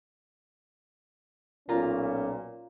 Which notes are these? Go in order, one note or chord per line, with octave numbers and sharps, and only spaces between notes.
B1 A#2 C#4 F4 A#5